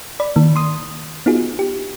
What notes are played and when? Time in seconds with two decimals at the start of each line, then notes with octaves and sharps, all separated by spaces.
0.20 D5 B5
0.36 D#3 A#3
0.56 C6 D#6
1.26 B3 D#4 F4 F#4 G#4
1.59 G4